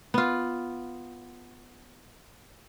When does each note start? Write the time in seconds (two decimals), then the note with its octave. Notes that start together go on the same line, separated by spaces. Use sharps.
0.14 B3 F4